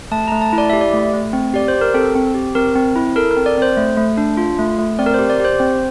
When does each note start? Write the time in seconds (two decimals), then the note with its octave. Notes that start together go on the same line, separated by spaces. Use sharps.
0.12 A3 A5
0.28 A#5
0.32 A3
0.42 A5
0.53 E4
0.58 D5
0.70 G4 E5
0.81 D5
0.93 A3
1.13 A3
1.33 C4
1.54 G4 D5
1.68 C5
1.74 G4
1.81 A#4
1.94 C4 A4
2.15 C4
2.34 G4
2.55 C4 A#4
2.76 C4
2.96 E4
3.16 A4 A#4
3.31 A#4
3.37 C4
3.46 D5
3.57 C4 C5
3.77 A3
3.97 A3
4.17 D4
4.37 F4
4.59 A3
4.79 A3
4.99 C4 D5
5.06 A#4
5.14 C5
5.19 G4
5.30 D5
5.40 G4 C5
5.60 C4